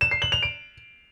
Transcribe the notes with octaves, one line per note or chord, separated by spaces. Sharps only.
E7
C7
F#7
F7
D7